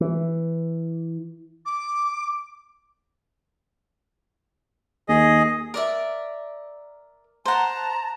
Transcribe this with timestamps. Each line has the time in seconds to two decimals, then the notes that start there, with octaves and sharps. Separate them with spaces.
0.01 E3
1.65 D6
5.09 D#2 G#4 D#5
5.74 A#4 D5 E5
7.45 C5 F#5 A5 A#5